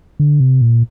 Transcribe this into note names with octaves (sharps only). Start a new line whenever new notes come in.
D3
C3
A#2